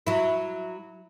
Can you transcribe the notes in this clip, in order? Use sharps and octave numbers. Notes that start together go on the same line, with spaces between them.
F#3 E4